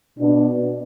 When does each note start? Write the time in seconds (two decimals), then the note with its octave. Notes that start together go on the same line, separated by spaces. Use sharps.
0.17 B2 B3 D4